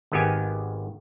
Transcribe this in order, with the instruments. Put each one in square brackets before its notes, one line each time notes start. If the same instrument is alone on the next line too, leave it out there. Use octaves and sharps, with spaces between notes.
[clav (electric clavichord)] G#1 D#3 B3 G4 G#5